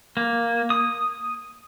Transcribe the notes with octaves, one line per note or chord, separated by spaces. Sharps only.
A#3
D#6